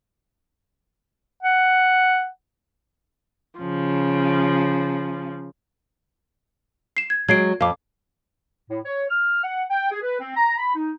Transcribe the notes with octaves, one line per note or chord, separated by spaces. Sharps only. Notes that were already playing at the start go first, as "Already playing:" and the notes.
F#5
C#3 F3
C7 E7
G#6
F#3 G#3 G#6 C7 D7
F2 F5 D6
A2
C#5
F6
F#5
G5
G#4
B4
C4
A#5
B5
D#4